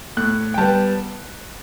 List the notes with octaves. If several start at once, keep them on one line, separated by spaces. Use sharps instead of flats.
A2 F#6
G5
G3 B3 A5